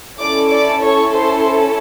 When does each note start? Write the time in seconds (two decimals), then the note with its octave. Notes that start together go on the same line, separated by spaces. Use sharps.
0.19 C#4 E4 A4 D5 D6
0.50 D5 D6
0.82 C#5 C#6
1.14 C5 C6